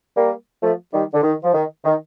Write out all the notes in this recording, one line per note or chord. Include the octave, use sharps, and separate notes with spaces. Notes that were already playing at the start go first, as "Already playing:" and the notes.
G3 A#3
F3 A3
D#3 G3
D3
D#3
F3
D#3
D#3